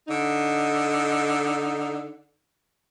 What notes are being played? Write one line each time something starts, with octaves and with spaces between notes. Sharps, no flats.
D3 D#4